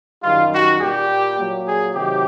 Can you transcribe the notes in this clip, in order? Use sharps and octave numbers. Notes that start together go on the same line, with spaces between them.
F#2 D#3 G3 F4
F#4
A#2 G3 G4
A#2 F#3
G#4
C3 D#3 F#3 G4